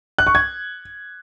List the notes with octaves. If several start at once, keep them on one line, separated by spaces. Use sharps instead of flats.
F#6
C#6
G#6